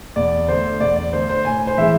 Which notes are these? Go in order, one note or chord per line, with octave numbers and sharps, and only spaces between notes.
E2 D5
D3 A3 C5
E2 D5
D5
D3 A3 C5
C5
A2 G#5
C5
E3 G#3 E5